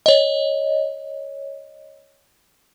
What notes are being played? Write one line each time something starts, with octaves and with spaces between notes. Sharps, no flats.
C#5 D#5